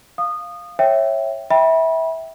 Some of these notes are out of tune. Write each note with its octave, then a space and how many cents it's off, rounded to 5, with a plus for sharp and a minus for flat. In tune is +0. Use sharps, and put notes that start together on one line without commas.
F5 +0 D#6 -20
C#5 -15 E5 +0 G5 +0
E5 -20 G5 +0 B5 -30